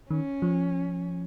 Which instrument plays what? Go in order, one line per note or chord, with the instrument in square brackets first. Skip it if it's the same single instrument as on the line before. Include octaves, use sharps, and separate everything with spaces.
[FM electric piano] D#3 [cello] C#4
[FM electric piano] F3